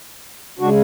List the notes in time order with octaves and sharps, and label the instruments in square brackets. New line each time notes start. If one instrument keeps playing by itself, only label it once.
[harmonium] C#3 G#3 D4 F#4